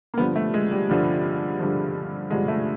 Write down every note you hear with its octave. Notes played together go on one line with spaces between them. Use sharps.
A#3
G2 D3 F3 B3
A3
G#3
G3
G2 D3 F3
G2 D3 F3
G2 D3 F3 G#3
A3